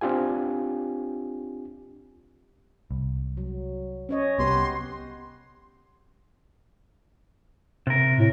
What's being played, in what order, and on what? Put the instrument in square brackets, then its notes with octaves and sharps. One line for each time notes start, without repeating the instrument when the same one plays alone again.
[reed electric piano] C4 D4 F4 G4 G#5
[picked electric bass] C2
[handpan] F#3
C#4 C#5 D#5
[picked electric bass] C2 [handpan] B3 G4 B4 [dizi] C6
[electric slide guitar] C3 A#4
[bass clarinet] A2